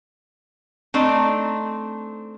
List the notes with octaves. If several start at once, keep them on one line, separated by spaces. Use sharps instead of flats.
A3 C4 D4 D#4